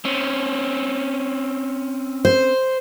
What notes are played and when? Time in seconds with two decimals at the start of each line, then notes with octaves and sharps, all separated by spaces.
0.05 C4 C#4
2.25 C5